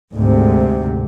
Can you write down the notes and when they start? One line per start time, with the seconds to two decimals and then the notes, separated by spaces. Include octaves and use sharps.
0.14 D2 G#2 C3